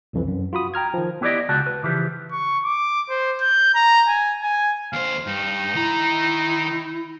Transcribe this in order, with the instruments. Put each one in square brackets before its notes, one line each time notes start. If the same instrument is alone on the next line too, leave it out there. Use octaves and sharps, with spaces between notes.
[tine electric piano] C2 F2 E3
F#2
F4 F#4 B5 D#6
G5 A#5 F6 G#6
D#3 F3
[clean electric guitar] B3 E4 G4 C5 D5 D#5
C#2 F#4 A5
B4
C#3 E3 F3 G4
[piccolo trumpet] C#6
D6
C5
G6
A#5
G#5
G#5
[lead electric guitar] D#2 C5 [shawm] F5
[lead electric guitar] G2 [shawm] D#4
[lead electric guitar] D#3 A#5 [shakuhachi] E4